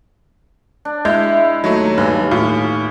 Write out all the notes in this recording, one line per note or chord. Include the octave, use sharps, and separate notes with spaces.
D4
G#3 E4 G6
D#2 F#3 A3 D#4 C#5 A#5
G2 G#5 D6
A2 F4